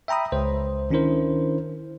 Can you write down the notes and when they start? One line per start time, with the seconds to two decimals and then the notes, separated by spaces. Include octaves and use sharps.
0.08 E5 G5 A#5 B5 D#6
0.32 C#2 C5
0.90 D#3 C#4 D4 E4 A#4 C5